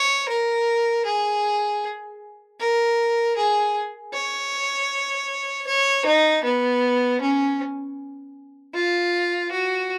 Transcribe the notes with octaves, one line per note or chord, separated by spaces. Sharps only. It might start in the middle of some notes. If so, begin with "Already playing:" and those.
Already playing: C#5
A#4
G#4
A#4
G#4
C#5
C#5
D#4
B3
C#4
F4
F#4